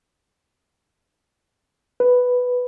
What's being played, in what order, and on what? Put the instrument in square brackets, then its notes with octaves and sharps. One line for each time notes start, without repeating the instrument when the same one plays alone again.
[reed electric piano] B4